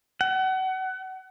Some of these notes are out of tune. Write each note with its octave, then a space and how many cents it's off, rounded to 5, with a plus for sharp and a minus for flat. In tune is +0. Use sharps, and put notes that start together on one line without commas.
F#5 +30